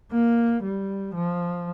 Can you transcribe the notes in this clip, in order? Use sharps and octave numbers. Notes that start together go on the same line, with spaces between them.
A#3
G3
F3